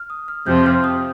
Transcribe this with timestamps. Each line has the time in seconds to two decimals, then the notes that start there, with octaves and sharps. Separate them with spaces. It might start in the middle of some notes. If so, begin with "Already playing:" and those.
Already playing: F6
0.10 D#6
0.28 F6
0.46 F2 C3 F3 C4 G6
0.66 F6
0.84 D#6